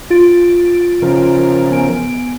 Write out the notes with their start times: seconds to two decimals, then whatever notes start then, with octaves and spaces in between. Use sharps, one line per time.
0.10 F4 A6 D7
1.02 C#3 F3 A#4
1.70 B3 G#5 D7